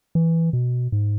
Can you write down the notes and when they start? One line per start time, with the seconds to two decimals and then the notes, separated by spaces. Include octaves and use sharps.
0.15 E3
0.53 B2
0.92 G#2